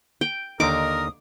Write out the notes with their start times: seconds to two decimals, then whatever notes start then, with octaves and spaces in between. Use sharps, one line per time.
0.21 G5
0.60 D#2 D3 D#4 A#4 D6 D#6